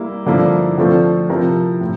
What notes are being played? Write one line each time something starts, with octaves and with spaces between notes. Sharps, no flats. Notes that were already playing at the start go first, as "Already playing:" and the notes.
Already playing: G3 A#3 E4
G2 D3 F3 A#3 E4
D3 F3 A3 C4 F4
C3 F3 C4 E4 A#4
A2